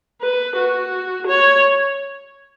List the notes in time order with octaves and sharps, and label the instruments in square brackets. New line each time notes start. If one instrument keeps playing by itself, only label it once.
[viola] B4
F#4
C#5